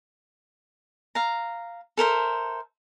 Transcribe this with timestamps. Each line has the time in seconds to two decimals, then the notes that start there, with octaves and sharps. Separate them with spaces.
1.15 F5 A#5
1.97 A4 A#4 C5 E5